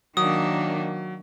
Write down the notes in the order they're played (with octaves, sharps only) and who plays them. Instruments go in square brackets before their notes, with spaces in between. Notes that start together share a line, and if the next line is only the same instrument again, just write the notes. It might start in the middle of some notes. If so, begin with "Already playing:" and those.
[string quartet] D#3 A#3 D4 [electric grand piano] F#3 [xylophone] D#6